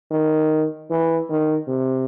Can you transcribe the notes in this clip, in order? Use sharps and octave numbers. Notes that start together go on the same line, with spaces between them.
D#3
E3
D#3
C3